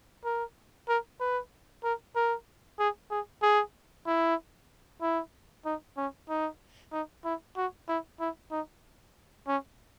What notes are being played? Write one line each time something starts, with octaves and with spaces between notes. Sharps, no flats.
A#4
A#4
B4
A#4
A#4
G#4
G#4
G#4
E4
E4
D#4
C#4
D#4
D#4
E4
F#4
E4
E4
D#4
C#4